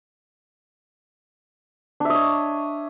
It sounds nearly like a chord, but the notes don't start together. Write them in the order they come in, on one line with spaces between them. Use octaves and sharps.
D4 E5 D#5 C#5